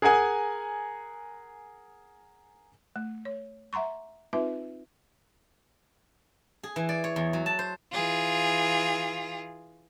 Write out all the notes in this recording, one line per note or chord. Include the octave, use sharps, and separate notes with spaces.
G#4 A#4 F#5 G#5 D#6
A3
C#5
E5 F#5 A#5 C6 C#6
C4 D#4 F4 B4 E5
G#4
E3
D5
C#5
E2
F#3
A5
C5
E3 F4 G#4